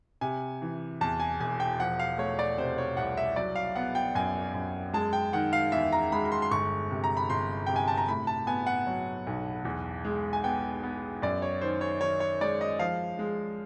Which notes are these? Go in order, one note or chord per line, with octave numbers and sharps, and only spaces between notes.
C3 G#5
E3
E2 A5
G#5
E1 G#5
G5
F3 F#5
F5
A3 C#5
D5
C3 C5
C#5
C2 F#5
E5
F#3 D5
F5
B3 F#5
G5
F#2 G#5
F#2
G#3 A5
G5
D#3 F#5
F5
E2 E5
A#5
G#3 B5
B5
C6
C6
G1 C#6
C3
A#5
B5
G1 C6
C3 G5
G#5
A5
A#5
A2 B5
A5
B3 G#5
F#5
F#3
B1
E2
G#3
G#5
B3 G5
B3
F#2 D5
C#5
D#3 C5
C#5
D#3 C#5
C#5
G#3 D5
D#5
F3 F5
G#3